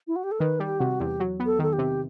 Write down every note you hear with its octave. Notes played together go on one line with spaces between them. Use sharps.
E4
F#4
G4
A4
D#3 B4
G3 G4
C3 F#4
E2 G4
F#3
B3
A4
D#3 A4
G4
C3